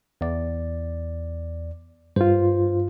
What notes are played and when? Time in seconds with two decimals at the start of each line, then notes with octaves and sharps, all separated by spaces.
0.21 E2 D5
2.16 G2 F4 C5